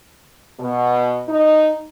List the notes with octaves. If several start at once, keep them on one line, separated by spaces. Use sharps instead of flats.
B2
D#4